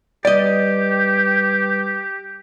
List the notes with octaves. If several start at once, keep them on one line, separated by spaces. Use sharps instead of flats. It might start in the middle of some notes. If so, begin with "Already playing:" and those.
G3 G4 B4 D5 D#5